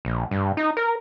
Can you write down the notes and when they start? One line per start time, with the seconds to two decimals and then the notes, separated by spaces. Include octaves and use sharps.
0.05 A#1
0.31 G2
0.57 D#4
0.77 A#4